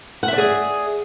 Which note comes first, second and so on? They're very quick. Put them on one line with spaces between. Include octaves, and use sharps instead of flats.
F#5 E5 D5 G#4